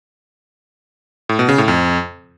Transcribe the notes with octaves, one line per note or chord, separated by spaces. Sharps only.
A2
B2
C#3
A2
F2